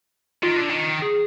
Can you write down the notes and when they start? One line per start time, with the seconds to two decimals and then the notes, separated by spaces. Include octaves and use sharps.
0.43 D#3 F4
0.56 D3
0.69 D#3
1.02 G#4